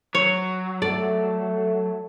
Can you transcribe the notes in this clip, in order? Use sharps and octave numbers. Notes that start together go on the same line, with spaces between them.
F#3 C#5
A3 A4 D5